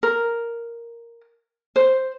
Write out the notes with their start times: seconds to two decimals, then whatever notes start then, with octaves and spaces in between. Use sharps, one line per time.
0.03 A#4
1.76 C5